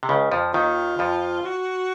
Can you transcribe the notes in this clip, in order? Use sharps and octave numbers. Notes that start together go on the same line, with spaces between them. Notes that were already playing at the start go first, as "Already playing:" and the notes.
C3
C#2 C#3
F2 F3
D#2 D#3 F4
F2 F3
F#4